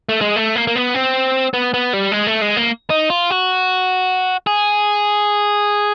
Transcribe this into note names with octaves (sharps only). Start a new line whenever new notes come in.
A3
G#3
A3
A#3
A#3
B3
C4
B3
B3
G3
G#3
A3
G#3
A#3
D#4
F4
F#4
G#4